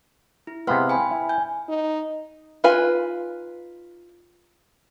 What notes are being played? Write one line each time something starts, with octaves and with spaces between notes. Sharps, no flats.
E4
C3 G#3 B3 F5 C6 F6
G5 G#5 B5
E4
G#5 G6
D#4
D#4 F4 B4 G#5